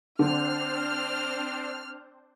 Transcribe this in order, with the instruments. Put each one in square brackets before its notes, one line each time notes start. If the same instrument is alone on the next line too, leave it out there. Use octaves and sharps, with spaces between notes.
[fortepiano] D3 [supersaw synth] C4 D4 C5 [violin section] F6